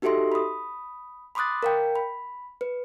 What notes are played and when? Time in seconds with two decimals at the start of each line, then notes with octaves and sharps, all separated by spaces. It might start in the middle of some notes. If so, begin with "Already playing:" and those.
0.02 D#4 F#4 G4 A4 E5 C6
0.32 B5 D#6
1.35 B5 C6 D6 D#6 F#6 A6
1.63 A#4 F5 G5
1.96 B5
2.61 B4